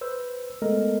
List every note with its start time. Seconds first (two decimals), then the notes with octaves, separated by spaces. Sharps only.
0.01 B4 C5 E6
0.62 G#3 A3 B3 A4 A#4 D#5